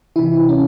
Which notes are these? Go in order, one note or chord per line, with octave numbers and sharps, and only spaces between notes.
C3 E3 E4
C#4